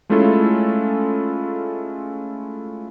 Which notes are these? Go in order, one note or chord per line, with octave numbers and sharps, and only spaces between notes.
G#3 A3 C#4 E4 F4 A4